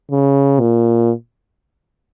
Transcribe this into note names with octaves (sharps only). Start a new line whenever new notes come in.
C#3
A#2